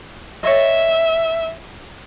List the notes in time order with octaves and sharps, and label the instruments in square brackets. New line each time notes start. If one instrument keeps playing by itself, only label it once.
[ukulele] C#5 D#5 [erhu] E5